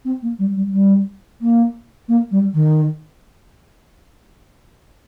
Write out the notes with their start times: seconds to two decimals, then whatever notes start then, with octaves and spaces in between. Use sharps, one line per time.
0.05 C4
0.22 A#3
0.39 G3
0.56 G3
0.73 G3
1.41 A#3
2.08 A#3
2.31 G3
2.54 D#3